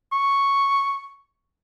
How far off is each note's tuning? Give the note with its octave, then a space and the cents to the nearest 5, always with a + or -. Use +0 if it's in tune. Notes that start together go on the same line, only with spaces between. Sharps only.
C#6 +0